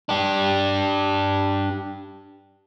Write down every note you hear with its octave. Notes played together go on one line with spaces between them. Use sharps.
D4 G4